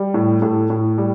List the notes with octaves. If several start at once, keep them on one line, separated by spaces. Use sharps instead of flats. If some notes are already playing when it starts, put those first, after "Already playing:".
Already playing: G3
A2
A2 A4
A2
G3